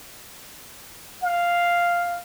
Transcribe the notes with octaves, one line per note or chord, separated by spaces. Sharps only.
F5